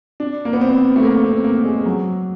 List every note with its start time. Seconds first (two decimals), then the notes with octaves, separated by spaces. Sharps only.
0.20 D4
0.45 A#3
0.53 B3
0.61 C4
0.96 A3
1.03 A#3
1.24 C4
1.44 A#3
1.65 G#3
1.86 F#3